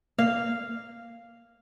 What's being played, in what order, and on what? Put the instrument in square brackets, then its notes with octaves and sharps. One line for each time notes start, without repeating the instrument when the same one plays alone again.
[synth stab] A#3 [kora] F5